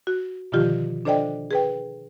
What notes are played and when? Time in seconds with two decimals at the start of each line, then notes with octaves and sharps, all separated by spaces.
0.07 F#4
0.52 B2 D3 D#3 F3 F4 G4
1.05 D4 A4 C5 D5 D#5 G5
1.51 G#4 B4 G5